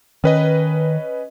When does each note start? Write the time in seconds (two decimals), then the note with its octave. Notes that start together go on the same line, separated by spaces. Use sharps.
0.24 D#3 C#4 B4 D#5